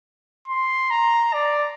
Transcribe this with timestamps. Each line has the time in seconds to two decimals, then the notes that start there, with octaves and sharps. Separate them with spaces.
0.48 C6
0.91 A#5
1.34 D5